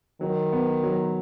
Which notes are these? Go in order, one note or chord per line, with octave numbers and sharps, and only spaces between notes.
D#3 F#3
B3
F#3